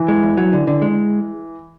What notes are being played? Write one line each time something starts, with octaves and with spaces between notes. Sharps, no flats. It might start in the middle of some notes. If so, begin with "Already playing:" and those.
Already playing: E3
G#3
E2
F#3
D3
D3
G#3